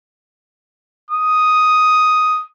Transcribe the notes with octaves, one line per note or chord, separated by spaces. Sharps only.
D#6